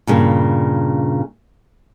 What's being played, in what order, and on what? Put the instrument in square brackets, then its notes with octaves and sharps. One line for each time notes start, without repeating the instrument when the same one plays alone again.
[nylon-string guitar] G2 A#2 C#3